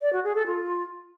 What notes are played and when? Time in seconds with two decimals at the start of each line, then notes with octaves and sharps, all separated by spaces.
0.01 D5
0.13 F#4
0.24 G#4
0.35 A4
0.46 F4